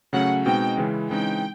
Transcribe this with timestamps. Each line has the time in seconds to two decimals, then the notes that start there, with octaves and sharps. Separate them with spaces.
0.13 C#3 F#3 A3 C#4 F#5
0.45 B2 G#3 C4 D#4 G5
0.77 C#3 E3 G#3 C#4 E4
1.10 C#3 E3 G#3 C4 D#4 G5